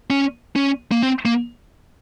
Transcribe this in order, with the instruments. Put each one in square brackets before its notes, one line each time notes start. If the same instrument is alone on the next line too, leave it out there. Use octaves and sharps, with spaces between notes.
[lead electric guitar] C#4
C#4
A#3
C4
A#3